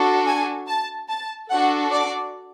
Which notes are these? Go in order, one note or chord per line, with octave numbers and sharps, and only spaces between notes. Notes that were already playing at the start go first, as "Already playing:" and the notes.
Already playing: D4 F#4 A4
G#5
A5
A5
D4 F#4 A4 F#5
D5